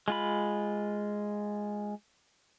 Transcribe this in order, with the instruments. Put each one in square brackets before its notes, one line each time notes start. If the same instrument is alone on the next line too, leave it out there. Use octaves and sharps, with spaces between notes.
[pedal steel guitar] G#3 F4 B5